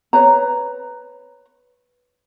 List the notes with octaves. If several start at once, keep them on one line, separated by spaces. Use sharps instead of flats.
B4 C#5 A#5